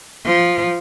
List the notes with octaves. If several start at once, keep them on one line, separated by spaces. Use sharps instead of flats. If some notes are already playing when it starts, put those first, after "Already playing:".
F3